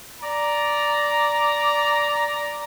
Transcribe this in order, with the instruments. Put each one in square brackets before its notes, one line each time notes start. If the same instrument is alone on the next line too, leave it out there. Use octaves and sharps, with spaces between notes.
[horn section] D5 A#5